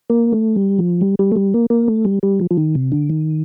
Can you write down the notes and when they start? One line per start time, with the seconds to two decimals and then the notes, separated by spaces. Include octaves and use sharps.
0.10 A#3
0.32 A3
0.56 G3
0.78 F3
1.01 G3
1.19 G3
1.32 A3
1.36 G3
1.54 A#3
1.70 A#3
1.88 A3
2.05 G3
2.23 G3
2.40 F3
2.51 F3
2.57 D#3
2.75 C3
2.92 D3
3.10 D#3